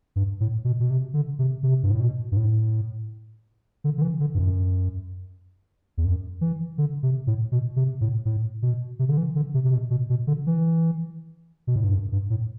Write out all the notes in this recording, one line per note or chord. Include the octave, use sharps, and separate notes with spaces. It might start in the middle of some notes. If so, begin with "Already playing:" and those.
G2
A2
B2
B2
C3
D3
C3
C3
G2
A2
B2
G2
A2
D3
D3
E3
D3
G2
F#2
E2
F#2
E3
D3
C3
A2
B2
C3
A2
A2
B2
C3
D3
E3
D3
C3
C3
B2
B2
B2
D3
E3
B2
A2
G2
F#2
G2
A2